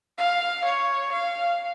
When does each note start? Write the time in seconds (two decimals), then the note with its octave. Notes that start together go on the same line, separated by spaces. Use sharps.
0.18 F5
0.64 C#5
1.12 F5